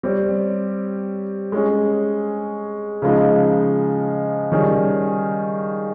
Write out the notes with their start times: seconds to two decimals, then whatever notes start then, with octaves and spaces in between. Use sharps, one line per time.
0.03 G3 C4 G4 C#5
1.52 G#3 C#4 G#4
3.02 C#3 F3 G#3 D#4
4.52 D#3 G3 C#4 G#4